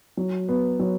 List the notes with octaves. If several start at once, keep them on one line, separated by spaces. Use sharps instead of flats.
F#3
B3
F#3